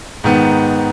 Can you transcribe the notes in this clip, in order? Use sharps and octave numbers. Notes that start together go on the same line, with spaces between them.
G#2 D#3 B3